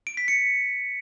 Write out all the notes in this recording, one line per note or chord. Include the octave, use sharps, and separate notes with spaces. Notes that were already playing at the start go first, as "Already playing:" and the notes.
D7
B6
C#7